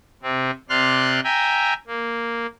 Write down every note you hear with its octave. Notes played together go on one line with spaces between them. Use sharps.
C3 C4
C3 D5 C6 F6 F#6
E5 G5 G#5 A#5
A#3